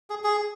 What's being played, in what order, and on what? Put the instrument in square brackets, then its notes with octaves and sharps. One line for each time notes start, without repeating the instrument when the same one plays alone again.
[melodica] G#4
G#4